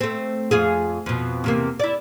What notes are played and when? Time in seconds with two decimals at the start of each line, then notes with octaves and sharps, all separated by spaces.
0.01 A3 C4
0.51 F2 F4 G#4
1.06 F2 B2
1.44 E2 C3 A#3
1.80 E4 D5